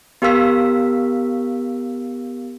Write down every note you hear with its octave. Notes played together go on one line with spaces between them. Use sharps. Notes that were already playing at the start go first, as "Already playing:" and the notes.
B3 G4 A#4 F5 E6 B6